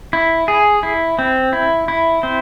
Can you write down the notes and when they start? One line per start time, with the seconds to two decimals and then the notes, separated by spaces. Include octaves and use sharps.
0.13 E4
0.48 G#4
0.83 E4
1.19 C4
1.53 E4
1.88 E4
2.23 C4